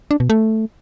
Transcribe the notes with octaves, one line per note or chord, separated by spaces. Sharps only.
D4
B2
A3